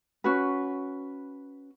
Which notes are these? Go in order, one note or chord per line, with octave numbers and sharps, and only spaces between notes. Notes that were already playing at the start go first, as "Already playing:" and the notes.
C#4 F#4 B4